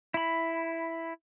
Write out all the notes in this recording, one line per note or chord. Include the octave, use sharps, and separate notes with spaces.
E4 B5